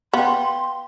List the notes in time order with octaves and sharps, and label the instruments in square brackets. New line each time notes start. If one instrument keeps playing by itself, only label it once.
[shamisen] B3 [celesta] F5 G5 [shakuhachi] C6